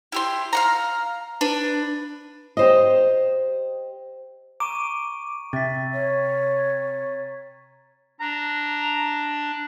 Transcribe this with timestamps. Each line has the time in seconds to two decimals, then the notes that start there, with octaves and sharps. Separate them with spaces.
0.12 E4 G4 C6
0.53 F5 F#5 A#5
1.41 D4 B4
2.57 G4 C5 D#5
4.60 A#5 C#6 D6 D#7
5.53 C3 E5 A6 B6
5.93 C#5
8.20 D4 A#5